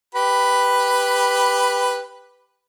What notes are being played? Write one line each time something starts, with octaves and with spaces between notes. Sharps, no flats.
G4 B4 B5